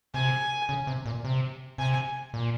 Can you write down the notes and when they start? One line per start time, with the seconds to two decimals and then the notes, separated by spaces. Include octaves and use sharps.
0.14 C3 G#5
0.69 C#3
0.87 C3
1.06 A#2
1.24 C3
1.78 C3 G#5
2.34 A#2